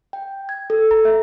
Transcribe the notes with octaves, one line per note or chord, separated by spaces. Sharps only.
G5
G#6
A4
A#5
E5